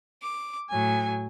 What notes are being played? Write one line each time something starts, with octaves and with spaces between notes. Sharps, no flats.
D6
A2 F#3 G#5